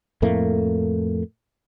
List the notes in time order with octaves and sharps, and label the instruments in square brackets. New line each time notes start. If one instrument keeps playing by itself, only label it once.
[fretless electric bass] F2 A2 A3 A#3